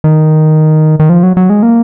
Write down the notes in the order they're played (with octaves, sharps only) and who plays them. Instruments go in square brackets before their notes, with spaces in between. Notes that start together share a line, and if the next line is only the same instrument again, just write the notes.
[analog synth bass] D#3
D#3
F3
F#3
F#3
G#3
A#3